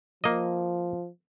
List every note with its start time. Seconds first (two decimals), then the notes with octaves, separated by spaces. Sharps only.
0.24 F3 A#3 D#5